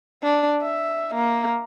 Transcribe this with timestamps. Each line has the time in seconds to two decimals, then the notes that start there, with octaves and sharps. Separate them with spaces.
0.23 D4
0.63 E5
1.15 A#3